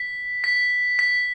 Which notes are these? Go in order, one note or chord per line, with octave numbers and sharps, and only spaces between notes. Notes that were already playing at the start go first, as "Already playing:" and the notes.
Already playing: B6
B6
B6